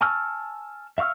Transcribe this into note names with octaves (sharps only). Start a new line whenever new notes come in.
G#5 A5 C#6 E6 F6
E5 F5 C#6 E6 F6